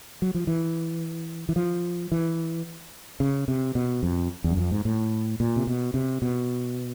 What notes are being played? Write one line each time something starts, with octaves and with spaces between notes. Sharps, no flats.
F#3
F3
E3
E3
F3
E3
C#3
C3
B2
F2
E2
F#2
F2
G#2
A2
A#2
C3
B2
C3
B2